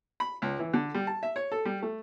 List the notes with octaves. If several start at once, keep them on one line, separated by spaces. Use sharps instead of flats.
B5
C#2
E3
D3
G3
A5
E5
C#5
A4
G3
A3